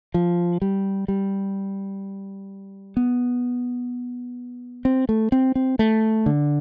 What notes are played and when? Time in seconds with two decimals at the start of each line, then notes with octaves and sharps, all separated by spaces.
0.14 F3
0.62 G3
1.08 G3
2.97 B3
4.85 C4
5.09 A3
5.32 C4
5.55 C4
5.79 A3
6.26 D3